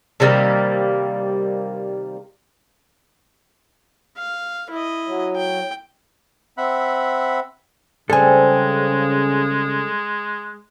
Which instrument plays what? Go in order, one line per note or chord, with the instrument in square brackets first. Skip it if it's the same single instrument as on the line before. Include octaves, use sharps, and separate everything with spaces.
[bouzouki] C3 D#3 G3 A#3
[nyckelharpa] F5
E4 D#5
[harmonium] F#3
[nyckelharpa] G5
[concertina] C4 E5 F#5 B5
[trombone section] C#3 [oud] G3 C4 [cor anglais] G#3 [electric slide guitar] A4 G#5